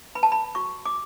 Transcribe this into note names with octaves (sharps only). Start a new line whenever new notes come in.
B4 B5
A5
B5
F#4 C#6
D6